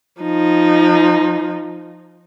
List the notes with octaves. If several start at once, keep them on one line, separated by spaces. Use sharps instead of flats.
F3 D#4